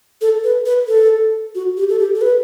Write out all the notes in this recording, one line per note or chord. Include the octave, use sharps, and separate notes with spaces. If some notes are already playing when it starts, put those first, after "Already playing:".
A4
B4
B4
A4
F#4
G4
A4
G4
A4
B4